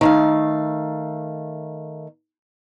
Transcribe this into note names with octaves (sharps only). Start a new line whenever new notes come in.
D#3 A3 F5